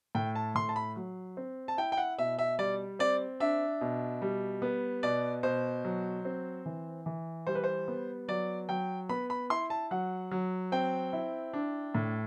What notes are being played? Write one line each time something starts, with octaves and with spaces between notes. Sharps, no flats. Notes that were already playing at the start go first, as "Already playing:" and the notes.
A2 G5
A5
A2 C6
A5
B5
F#3
C4
A5
E4 G5
G5
F#5
B2 E5
E5
G3 D5
C4 D5
D4 E5
B2
G3
B3
B2 D5
B2 C5
F#3
C4
E3
E3
G3 C5
B4
C5
B3
F#3 D5
F#3 G5
B3 B5
B5
E4 C6
A5
F#3 F#5
F#3
C4 G5
E4
D4
A2